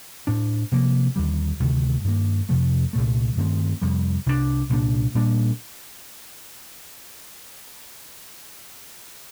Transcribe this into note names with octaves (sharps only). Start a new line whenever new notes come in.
A2 A3 D4
C3 F3 A#3
D#2 D3 G3
D2 C3 D#3 A3
G2 D#3 A#3
F2 C3 F3 A3
C2 A#2 A3
G2 D#3 A3 C4
F2 C3 G3
C2 C3 G3 D4
C2 A#2 G3 D4
A#2 G3 A#3 D4